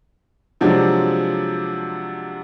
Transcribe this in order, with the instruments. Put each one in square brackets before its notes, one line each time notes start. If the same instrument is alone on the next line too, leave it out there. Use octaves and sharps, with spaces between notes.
[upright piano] C3 F3 F#3 G#3 D4